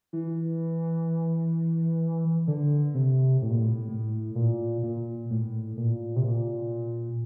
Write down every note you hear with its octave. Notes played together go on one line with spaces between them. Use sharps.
E3
D3
C3
A2
A#2
A2
A2
A#2
A#2
A2
A#2
C3
A#2